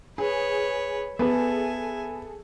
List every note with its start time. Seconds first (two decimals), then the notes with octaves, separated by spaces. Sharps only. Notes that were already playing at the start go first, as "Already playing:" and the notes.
0.18 G#4 B4 C#5
1.19 B3 G#4 A4 E5 G#5